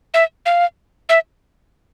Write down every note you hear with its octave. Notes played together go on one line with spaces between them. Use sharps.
E5
F5
E5